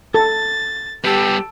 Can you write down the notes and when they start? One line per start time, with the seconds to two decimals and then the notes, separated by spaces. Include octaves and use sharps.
0.14 A4 A6
1.04 G3 B3 G4 A4